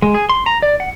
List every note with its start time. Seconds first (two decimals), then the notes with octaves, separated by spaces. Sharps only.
0.02 G#3
0.14 G#4
0.29 C6
0.46 A#5
0.62 D5
0.80 F#5